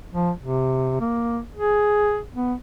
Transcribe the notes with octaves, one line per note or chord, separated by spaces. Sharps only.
F3
C3
A#3
G#4
B3